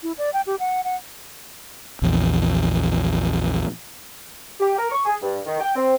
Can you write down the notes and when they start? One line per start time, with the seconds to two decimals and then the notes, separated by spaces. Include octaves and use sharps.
0.03 E4
0.18 D5
0.33 G5
0.46 G4
0.60 F#5
0.84 F#5
2.02 A#1 E2
4.60 G4
4.77 A#4
4.90 C#6
5.05 G#4
5.22 G2
5.46 D#3
5.60 G5
5.75 C4